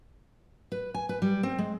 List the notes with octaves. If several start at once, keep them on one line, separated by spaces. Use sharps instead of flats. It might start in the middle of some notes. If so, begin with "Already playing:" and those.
B4
G#5
B4
G3
C4
G#3